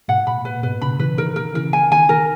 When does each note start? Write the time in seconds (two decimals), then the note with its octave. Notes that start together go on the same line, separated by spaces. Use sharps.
0.08 G#2 B2 F#5
0.27 A#2 B5
0.45 A#2 B4
0.63 G#2 B2 B4
0.81 A#2 C#3 B5
0.99 C#3 E3 B4
1.18 B2 D#3 A#4
1.36 A#4
1.54 C#3 E3 A#4
1.73 G#5
1.91 B2 D#3 G#5
2.09 B2 D#3 A#4